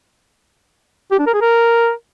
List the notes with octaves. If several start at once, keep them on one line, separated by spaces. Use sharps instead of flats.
G4
D4
A#4
G#4
A#4